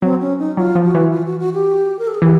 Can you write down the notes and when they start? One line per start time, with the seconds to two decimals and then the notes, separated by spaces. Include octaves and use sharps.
0.02 F#3 C4
0.21 C#4
0.39 D#4
0.57 F#3 F4
0.75 F3
0.85 F#4
0.94 E3
1.13 F4
1.26 F#4
1.40 F#4
1.54 G4
1.99 A#4
2.07 A4
2.14 G#4
2.22 E3 G4